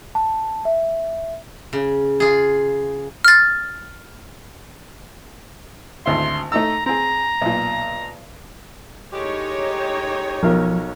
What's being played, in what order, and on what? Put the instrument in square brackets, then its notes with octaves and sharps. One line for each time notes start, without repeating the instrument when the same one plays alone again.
[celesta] A5
E5
[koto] C#3
F4 G#4
[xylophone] F6 A6
[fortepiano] G#1 D2 E4 [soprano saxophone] C6
[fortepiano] A3 D#4 E6 [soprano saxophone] A#5
[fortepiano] C4 G#4 [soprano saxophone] A#5
[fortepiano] B1 A#2
[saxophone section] A2 G#3 G4 [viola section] D#4 C#5
[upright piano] B1 A#4 [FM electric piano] F3